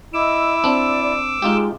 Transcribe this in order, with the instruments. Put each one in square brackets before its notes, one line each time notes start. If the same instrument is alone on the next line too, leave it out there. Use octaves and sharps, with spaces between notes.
[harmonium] E4 [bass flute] D#5 [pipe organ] D6 E6
[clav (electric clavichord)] C4 D4 [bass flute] D5
[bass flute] G#3 [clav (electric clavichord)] D#4 F4 G4